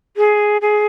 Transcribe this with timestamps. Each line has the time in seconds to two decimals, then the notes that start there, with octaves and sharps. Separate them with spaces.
0.17 G#4
0.61 G#4